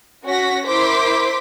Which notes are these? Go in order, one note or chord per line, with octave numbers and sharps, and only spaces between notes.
C#4 F#4 A#6 B6
E4 A#4 C5 C6 D6 B6